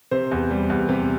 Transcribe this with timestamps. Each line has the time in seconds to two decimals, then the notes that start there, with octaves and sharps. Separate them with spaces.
0.11 C3 C5
0.31 E2
0.50 G3
0.70 E2
0.89 C3